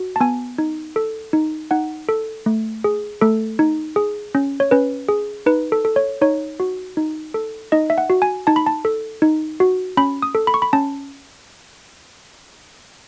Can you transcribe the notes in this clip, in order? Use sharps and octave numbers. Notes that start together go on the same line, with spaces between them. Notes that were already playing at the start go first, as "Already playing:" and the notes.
Already playing: F#4
A5
B3 G#5
D#4
A4
D#4
D#4 F#5
A4
A3
G#4
A3 A4
D#4
G#4
C#4
C#5
C#4 B4
G#4
D#4 B4
A4
A4
C#5
D#4 C#5
F#4
D#4
A4
D#4 D#5
E5
F#5
F#4
G#5
D#4 A5
B5
A5
A4
D#4
F#4
C#4 B5
D#6
A4
B5
C#6
B5
C#4 A5